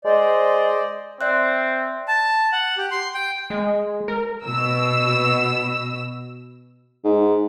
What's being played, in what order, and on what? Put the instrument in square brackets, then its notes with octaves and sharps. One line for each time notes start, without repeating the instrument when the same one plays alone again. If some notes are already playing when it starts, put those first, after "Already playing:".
[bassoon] G#3 [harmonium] C5 D5 [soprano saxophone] D#5
[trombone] C4 [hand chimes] D5 E5 F#6
[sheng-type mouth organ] A5
F#5
G4
C6
G5
[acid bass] G#3
A#4
[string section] B2 E6
[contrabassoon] G#2